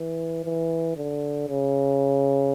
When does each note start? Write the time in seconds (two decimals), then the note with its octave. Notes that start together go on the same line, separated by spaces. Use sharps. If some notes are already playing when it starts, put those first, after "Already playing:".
Already playing: E3
0.44 E3
0.97 D3
1.48 C#3